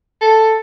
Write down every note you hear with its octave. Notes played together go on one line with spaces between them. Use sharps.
A4